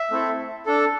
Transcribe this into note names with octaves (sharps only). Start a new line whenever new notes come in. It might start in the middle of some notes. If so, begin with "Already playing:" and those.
Already playing: E5
A3 C4 E4 A4
D4 A4